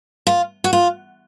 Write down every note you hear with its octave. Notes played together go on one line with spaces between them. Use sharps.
F4
F#4
F4